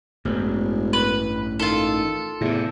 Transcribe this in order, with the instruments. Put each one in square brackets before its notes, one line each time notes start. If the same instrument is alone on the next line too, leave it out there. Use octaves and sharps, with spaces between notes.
[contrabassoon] E1 [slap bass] A1 G2
[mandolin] B4
[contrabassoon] D#3 [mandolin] F4 A4
[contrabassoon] E2 [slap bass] A2 C3